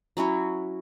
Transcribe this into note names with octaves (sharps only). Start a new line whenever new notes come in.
F#3 C#4 E4 F#4